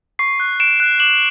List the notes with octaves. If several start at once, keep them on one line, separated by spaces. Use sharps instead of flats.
C#6 C7
F#6
C#6 D7 E7
F#6
D6 E7 F#7